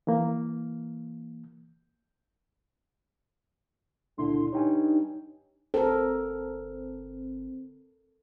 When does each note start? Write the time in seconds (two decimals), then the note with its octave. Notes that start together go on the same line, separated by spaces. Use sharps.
0.07 E3 A#3
4.18 C#2 A#2 D3 E4 C6
4.53 G2 D#4 C#5 G5 G#5
5.74 G1 C4 A4 A#4